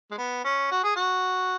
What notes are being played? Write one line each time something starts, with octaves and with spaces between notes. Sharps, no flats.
G#3
B3
C#4
F#4
G#4
F#4